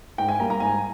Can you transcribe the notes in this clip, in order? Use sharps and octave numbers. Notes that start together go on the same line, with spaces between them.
G#2 G5
G#5
G3 A#3 A#5
A#5
G#2 G#5